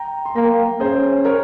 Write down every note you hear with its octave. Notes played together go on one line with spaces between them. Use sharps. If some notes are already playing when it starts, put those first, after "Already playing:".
Already playing: G5 A#5
C6
A#3 G5 A#5
C#4 G#4 C5
A#4 C#5